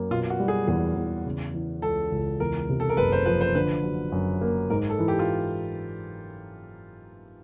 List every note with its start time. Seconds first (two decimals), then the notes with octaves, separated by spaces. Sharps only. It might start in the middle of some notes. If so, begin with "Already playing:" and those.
Already playing: F#2 A#3
0.11 B2 F4
0.30 F#4
0.40 G3
0.48 G#4
0.68 E2 G#4
0.97 E2
1.26 C#3
1.54 E3
1.82 C#2 A4
2.12 C#2
2.40 E2 A#4
2.69 C3
2.80 A4
2.90 A#4
2.97 F#1 B4
3.12 C5
3.26 F3 B4
3.41 C5
3.55 D3 B4
3.84 F#3
4.12 F#2
4.41 A#3
4.70 G#2 A#4
4.89 A4
4.99 E3
5.08 G4
5.19 F4